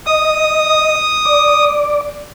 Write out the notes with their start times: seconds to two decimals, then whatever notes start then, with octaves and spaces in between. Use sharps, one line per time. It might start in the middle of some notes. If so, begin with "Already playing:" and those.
0.06 D#5 D#6
1.25 D5